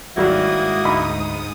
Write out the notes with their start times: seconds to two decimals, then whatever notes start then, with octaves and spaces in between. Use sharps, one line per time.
0.17 G#1 G#2 F#3 G3 A#3 E4 F#4 D#6
0.84 D2 D#4 B5